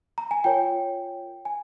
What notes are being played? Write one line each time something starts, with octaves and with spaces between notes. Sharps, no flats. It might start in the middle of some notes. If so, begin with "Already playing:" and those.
A#5
G#5
F4 A#4 C#5 G5
G#5